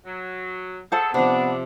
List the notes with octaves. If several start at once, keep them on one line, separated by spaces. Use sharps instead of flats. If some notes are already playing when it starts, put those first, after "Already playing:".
F#3
F#3 G#4 A4 C5 F#5 A5
C3 F3 B3 D4